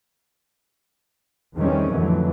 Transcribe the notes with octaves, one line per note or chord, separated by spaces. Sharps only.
E2 D#3 E3 G3 C4 C#4
F2 A2 D3 E3 F#3